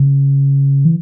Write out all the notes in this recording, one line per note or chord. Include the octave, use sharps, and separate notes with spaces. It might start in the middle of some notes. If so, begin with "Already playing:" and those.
Already playing: C#3
E3